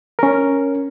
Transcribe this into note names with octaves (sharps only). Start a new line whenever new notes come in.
C#4 A#4